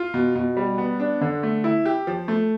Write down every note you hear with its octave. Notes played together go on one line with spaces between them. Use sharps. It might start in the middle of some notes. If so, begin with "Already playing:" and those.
Already playing: F4
B2
B2
G3
B3
D4
D3
A3
E4
G4
F3
A3